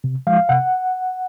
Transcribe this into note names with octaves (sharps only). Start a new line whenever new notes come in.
C3
F3 G#3 F5
C3 F#5